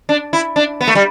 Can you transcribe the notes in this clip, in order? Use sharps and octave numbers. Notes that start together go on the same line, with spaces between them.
D4
E4
D4
B3
A3
G3